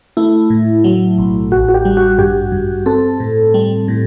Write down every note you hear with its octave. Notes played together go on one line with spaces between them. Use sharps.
A3 E4
A2
F#3
B1
A1 F#4
F#4
G4
G3
F#4
G2 G4
G2
C4 A4
A2
G3
A2